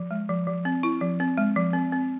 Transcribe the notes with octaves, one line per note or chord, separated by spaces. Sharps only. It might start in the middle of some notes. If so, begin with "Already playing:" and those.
Already playing: F3
G#3
F3
F3
C4
E4
F3
C4
G#3
F3
C4
C4